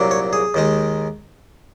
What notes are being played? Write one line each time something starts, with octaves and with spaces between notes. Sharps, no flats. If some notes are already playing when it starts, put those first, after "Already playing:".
Already playing: C2 A#2 F#3 A#3
C#5
G#4
D#2 D#3 G#3